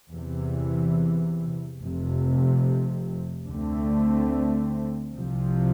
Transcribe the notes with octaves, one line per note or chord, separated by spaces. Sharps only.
E2 C3 E3
F1 F2 C3
D2 D3 A3 C4
C2 C3 F3